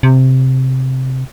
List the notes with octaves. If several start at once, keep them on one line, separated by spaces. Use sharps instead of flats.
C3